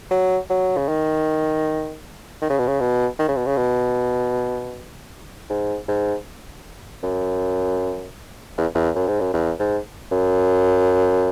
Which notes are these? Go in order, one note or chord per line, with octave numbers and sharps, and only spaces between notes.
F#3
F#3
C#3
D#3
D#3
C#3
B2
C#3
B2
D#3
C#3
B2
C#3
B2
G#2
G#2
F#2
E2
E2
F#2
G#2
F#2
E2
G#2
F#2